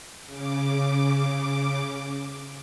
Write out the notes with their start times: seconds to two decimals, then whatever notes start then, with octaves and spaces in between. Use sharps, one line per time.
0.26 C#3 D6